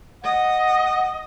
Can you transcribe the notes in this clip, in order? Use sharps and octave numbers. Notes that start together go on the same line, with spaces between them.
D#5 F#5